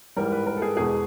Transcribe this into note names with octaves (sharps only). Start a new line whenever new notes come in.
G#2 E3 G3 A#4
B4
A#4
A4
G#4
E2 B2 G#3 G#4